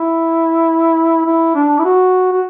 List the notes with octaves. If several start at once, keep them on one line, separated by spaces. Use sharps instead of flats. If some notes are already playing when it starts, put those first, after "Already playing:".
Already playing: E4
E4
D4
E4
F#4
F#4